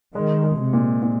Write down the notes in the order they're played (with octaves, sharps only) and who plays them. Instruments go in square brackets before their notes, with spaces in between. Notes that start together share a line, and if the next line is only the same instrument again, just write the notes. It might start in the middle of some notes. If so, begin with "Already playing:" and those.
[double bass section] D#3 [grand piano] G#3
[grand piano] G#3
[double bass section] C3
[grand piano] A#2
A#2